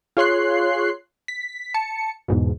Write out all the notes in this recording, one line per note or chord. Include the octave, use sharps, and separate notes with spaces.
F4 G#4 C#5 C6 F#6 C7
B6
A5 C#7
E2 G#2 B2